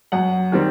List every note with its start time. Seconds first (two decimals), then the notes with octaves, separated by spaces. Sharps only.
0.12 F#2 F#5
0.52 D#3 G3 C4